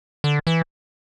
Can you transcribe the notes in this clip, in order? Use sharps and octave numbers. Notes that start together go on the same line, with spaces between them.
D3
E3